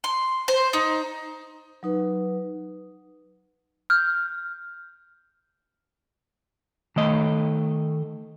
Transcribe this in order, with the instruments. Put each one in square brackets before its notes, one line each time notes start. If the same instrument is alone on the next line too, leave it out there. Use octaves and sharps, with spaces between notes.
[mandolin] C6
C5
D#4
[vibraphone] F#3 D#4 B4
[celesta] F6 G6
[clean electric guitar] D#3 A3 D#5